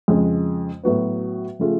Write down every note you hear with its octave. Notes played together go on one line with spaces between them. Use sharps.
F2 C#3 G#3
A2 F#3 B3 F#4 B4
C#3 F3 A3 F4 G#4